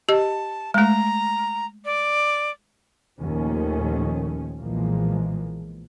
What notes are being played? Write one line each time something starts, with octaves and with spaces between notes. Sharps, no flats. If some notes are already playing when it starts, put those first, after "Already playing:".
G4 D#5 A5
G#3 A3 A#5
D5
D#2 A#2 D#3 F3 A3 C#4
B1 A#2 E3 F3 G#3 A#3